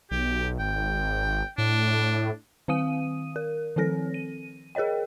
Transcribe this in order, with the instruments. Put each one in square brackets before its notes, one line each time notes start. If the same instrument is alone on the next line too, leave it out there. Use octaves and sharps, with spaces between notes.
[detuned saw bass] B1 [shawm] G4
[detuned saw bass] G#1 [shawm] G5
[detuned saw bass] A2 [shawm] D4
[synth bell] D#3 C4 F5 D#6 D#7
A#4
D#3 F3 C4 A4 A#6
D#7
G#4 A#4 C#5 D#5 G5